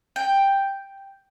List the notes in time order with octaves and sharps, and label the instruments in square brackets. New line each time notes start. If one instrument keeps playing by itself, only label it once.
[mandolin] G5